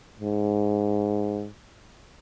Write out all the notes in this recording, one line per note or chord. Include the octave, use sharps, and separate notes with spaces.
G#2